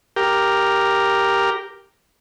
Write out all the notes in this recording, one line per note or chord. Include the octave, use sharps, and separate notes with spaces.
G4 A#4